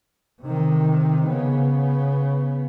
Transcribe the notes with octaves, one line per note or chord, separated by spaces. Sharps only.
C3 D#3
C#3 B3